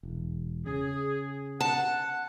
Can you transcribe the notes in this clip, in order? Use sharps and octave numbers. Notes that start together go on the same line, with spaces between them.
E1
C#3 G#4
F#5 A5